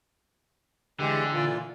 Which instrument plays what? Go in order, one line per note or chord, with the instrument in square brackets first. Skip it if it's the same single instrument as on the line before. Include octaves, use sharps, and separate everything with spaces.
[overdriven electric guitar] D3 [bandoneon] E3 G#3 G4
[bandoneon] A#2 E3 F4